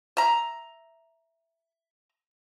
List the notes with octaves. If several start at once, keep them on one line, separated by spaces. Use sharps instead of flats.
E5 A#5